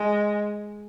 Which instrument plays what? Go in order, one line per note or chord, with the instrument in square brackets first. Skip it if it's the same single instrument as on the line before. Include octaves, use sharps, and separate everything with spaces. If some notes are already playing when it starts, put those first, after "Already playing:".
Already playing: [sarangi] G#3